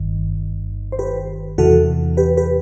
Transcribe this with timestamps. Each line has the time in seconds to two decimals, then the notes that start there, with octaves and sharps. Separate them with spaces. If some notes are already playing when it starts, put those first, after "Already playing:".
Already playing: G1 G2 D#3
0.92 C5
0.99 G4 B4
1.58 E2 C3 E3 F#4 A4
2.17 G4 B4
2.37 G4 B4